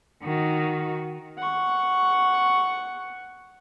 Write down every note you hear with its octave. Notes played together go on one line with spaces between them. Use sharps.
D#3 F#4
F#5 C#6